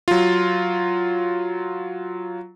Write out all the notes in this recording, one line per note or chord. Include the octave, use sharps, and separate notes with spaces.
F#3 F4